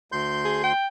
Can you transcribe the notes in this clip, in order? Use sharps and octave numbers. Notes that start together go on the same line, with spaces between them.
D2 C6 G6
G#4
G5